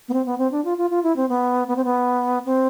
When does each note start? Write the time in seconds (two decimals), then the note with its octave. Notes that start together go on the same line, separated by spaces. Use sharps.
0.09 B3
0.13 C4
0.26 B3
0.38 C4
0.52 D4
0.65 F4
0.78 F4
0.90 F4
1.03 E4
1.16 C4
1.29 B3
1.68 B3
1.76 C4
1.85 B3
2.46 C4